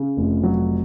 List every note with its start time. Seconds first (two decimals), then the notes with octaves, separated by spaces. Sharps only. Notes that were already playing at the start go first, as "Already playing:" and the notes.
Already playing: C#3
0.17 F1
0.43 F#3